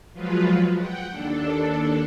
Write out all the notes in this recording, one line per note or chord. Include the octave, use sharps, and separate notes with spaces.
F3 F#3 G#3 F4 B4
F#5 G5
D#2 D4 A4